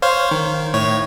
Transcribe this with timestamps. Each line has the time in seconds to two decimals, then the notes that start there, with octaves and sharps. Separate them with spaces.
0.02 C5 C#5 F5
0.31 D#3
0.74 A2 C#5